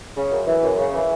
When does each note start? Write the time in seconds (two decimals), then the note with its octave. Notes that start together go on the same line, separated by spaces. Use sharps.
0.17 C#3
0.32 F#2
0.47 E3
0.63 F#2
0.78 C#3
0.93 E3